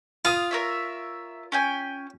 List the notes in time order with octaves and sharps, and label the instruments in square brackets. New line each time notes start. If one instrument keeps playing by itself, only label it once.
[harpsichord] F4 [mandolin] F5 D#6
[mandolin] A#4 C#5 E5
C#4 G5 G#5